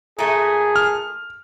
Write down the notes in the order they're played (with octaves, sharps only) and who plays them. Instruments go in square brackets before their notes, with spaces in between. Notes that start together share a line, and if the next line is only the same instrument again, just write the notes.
[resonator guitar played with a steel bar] A#2 A3 [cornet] G#4
[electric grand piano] F6